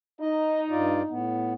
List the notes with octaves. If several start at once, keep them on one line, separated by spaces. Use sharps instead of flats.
D#4 D#5
G2 F4 D5
A2 B3